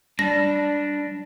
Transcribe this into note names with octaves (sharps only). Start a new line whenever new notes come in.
G3 D4 A#6